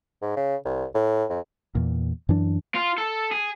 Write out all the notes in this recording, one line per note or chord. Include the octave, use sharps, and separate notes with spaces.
G#2
C#3
C2
A2
F2
E2 A#2
F#2 E3 D4
F4
A4
G#4